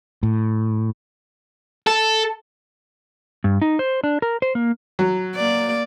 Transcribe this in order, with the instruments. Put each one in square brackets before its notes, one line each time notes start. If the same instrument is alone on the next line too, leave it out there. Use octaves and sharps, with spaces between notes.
[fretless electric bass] A2
[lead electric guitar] A4
[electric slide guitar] G2
D#4
C5
D4
A#4
C5
A#3
[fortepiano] F#3
[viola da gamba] A#3 D5